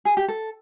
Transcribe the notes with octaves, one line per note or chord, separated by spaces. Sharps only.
G#4
G4
A4